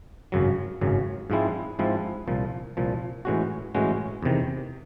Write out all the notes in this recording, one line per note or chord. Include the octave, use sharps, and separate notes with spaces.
G#1 F#2 C#3 F#3
G#1 F#2 C#3 F#3
G#2 F3 G#3 C4 E4
G#2 F3 G#3 C4 E4
C2 A#2 F3
C2 A#2 F3
A2 E3 G#3 C#4 F#4
A2 E3 G#3 C#4 F#4
E2 C3 D#3